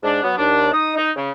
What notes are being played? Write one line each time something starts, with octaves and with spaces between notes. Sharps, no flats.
G#2 D4
F#3 B3
D#2 D4
D#4 D#6
D#4
C#3